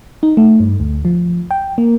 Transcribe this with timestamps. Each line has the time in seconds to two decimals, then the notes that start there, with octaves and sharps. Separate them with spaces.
0.23 D#4
0.37 A3
0.60 G2
0.80 D2
1.05 F3
1.51 G5
1.78 A#3